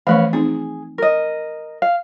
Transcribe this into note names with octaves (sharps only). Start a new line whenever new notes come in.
E3 F3 A3 C#4 B4 F5
C4 D#4 G#4
A#4 D#5
F5